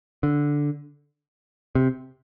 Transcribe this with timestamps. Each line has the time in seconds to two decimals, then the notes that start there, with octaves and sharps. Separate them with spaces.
0.23 D3
1.75 C3